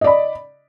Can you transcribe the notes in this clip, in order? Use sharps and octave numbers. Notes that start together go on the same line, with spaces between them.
D5 D#5 B5